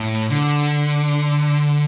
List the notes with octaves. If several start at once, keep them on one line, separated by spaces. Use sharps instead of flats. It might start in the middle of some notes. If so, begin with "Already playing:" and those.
Already playing: A2
D3